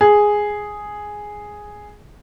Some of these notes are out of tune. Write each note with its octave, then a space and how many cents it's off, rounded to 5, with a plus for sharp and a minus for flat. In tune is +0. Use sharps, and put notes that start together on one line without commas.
G#4 +0